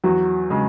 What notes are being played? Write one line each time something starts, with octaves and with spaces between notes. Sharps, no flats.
E2 F#3 F#4
C#3 G#3